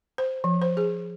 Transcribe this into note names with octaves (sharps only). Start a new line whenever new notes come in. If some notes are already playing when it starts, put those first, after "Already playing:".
C5
F3
C5
G#4